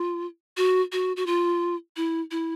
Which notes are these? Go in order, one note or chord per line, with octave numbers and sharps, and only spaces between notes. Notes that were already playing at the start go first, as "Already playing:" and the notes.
Already playing: F4
F#4
F#4
F#4
F4
E4
E4